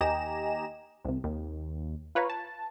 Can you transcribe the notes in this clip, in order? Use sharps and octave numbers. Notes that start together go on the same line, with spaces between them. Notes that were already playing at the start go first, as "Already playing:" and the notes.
D#2 G4 D#5 G#5 A#5 E7
C2 C3
D#2
F4 B4 C#5 F5 A#5
A5